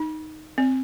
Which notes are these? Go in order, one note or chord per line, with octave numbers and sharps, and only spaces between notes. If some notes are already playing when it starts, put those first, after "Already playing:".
Already playing: D#4
C4